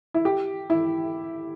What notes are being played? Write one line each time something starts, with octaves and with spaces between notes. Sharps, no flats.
E4
G4
E4